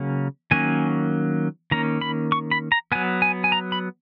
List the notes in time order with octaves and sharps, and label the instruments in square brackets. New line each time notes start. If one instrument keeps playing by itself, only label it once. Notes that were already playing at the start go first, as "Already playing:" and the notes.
Already playing: [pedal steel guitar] C#3 F#3 A#3 C#4
D#3 F#3 A#3 C#4 G#5
D#3 A#3 C#4 A#5
B5
C#6
B5
A#5
F#3 B3 G#5
G#5
G#5
A#5
B5